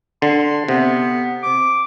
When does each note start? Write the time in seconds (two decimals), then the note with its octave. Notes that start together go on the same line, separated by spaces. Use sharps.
0.22 D3 C6
0.68 C3 B3
1.43 D6